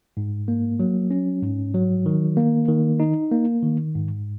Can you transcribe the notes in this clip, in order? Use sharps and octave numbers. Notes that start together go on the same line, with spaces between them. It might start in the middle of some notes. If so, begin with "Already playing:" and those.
G#2
A#3
F#3
C#4
G#2
F#3
D#3
A#3
D#3
D#4
A#3
D#3
G#2